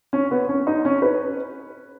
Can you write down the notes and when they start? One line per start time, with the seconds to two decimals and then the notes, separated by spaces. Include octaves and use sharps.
0.13 C#4
0.31 B3
0.49 C#4
0.67 D#4
0.85 C#4
1.02 B4